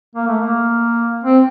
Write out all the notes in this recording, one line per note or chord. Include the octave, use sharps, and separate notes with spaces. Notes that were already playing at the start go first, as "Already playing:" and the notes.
A#3
A3
A#3
C4